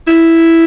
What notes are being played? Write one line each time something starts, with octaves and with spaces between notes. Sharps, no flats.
E4